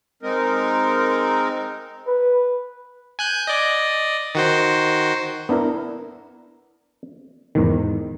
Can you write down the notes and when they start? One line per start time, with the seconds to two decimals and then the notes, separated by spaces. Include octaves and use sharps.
0.23 G#3 C4 D#4 A#4
2.07 B4
3.19 G#5 F#6 G6
3.47 D5 D#5
4.35 D#3 F#4 C5
5.49 B3 D4 E4 A#4
7.55 E2 G#2 D#3